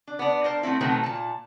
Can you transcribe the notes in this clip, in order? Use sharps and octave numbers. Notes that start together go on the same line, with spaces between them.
D4
B3 D4
A#4 C5 A5
A3 B3 C4 E4
B2 D#3 F#3 A3 B3 C4
A#2 A5